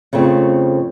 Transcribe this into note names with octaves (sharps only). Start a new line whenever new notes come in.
F2 C#3 A3 C4